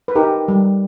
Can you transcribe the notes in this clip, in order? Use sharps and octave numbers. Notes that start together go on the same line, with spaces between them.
B4
D#4 G4 A#4
G3